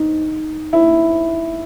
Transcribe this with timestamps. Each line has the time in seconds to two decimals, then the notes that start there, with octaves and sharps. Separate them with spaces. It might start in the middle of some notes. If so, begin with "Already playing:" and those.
Already playing: D#4
0.73 E4